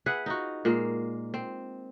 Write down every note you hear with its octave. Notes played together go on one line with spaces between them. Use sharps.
G#4 B4 E5 F#5
D#4 F4 F#4
A#2 G#3 A#3
C4